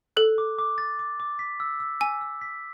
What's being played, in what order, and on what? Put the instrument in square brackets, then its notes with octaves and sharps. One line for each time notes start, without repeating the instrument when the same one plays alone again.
[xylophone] A4 [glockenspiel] F#6
[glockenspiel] D6
D6
A6
D6
D6
B6
E6
E6
[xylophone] G#5 [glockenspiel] E6
[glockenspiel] E6
B6